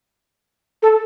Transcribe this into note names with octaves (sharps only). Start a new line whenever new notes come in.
A4